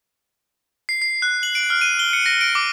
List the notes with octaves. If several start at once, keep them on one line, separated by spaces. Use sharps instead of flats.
C7
C7
F#6
F#7
D7
F6
D#7
G7
C#7
A#6
D7
D6